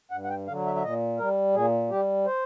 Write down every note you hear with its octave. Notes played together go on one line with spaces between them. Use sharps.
G2 F#5
F#5
G5
D3 F#3 F5
E5
E5
A#2 D#5
G3 A#4
A#2 G#4
G3 G4
C5